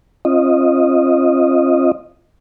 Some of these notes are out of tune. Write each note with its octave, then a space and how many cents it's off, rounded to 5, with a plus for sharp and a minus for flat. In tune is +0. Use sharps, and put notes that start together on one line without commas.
C4 +45 F4 -15 D#5 -5